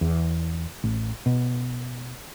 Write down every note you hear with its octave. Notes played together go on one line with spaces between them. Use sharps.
E2
A1
B2